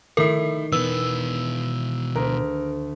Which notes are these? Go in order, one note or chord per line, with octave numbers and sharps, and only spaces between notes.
D#3 A3 E4 A#4
B2 E3 B3 E6
D2 A#4